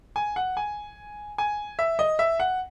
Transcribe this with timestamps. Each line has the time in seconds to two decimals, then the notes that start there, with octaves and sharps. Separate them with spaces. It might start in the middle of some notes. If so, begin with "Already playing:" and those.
0.16 G#5
0.36 F#5
0.57 G#5
1.38 G#5
1.79 E5
1.99 D#5
2.19 E5
2.40 F#5